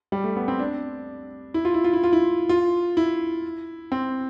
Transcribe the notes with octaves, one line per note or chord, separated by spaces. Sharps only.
G3
A3
B3
C4
D4
E4
F4
E4
F4
E4
F4
E4
F4
E4
C4